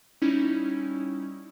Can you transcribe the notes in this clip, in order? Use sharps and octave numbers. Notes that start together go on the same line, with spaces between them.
G3 C#4 D#4 E4